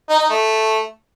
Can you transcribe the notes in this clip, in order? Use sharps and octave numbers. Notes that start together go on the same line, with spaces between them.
D#4
D#4
A3